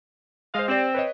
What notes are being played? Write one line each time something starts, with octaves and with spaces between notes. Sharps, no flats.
G#3 C5 D#5 F5
C4 G4 D5
B4 C#5 D#5